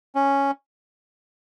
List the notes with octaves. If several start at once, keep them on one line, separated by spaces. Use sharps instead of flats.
C#4